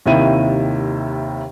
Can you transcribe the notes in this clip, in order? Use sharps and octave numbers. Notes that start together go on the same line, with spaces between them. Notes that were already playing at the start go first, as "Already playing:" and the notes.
D#2 C3 D#3 E4 E5 D#7